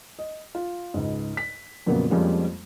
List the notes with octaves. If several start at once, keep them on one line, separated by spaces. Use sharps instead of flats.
D#5
F4
C#2 G#2
B6
F2 A#2 C#3 F#3 A#3 B3
F2 F3 G3 G#3 A#3 C#4